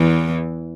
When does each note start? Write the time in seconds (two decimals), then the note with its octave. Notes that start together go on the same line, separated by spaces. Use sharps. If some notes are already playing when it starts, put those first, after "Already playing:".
Already playing: E2 E3